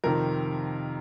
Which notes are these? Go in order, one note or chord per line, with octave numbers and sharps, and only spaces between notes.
F2 C3 D#3 A#4